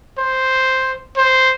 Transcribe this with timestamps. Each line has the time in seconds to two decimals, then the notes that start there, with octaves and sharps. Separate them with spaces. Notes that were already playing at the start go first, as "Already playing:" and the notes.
0.18 C5
1.17 C5